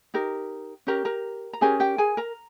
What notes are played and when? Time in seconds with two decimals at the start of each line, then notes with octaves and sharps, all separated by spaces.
0.14 D#4 G4 A#4
0.87 C#4 G4 A#4 A#5
1.05 A#4 A#5
1.53 A#5
1.61 C#4 G4 G#4 A#4 G#5
1.80 G4 G5
1.98 G#4 G#5
2.17 A#4 A#5